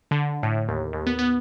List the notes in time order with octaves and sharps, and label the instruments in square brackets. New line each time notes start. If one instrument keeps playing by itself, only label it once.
[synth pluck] D3
A2
D#2
D#2
B3
B3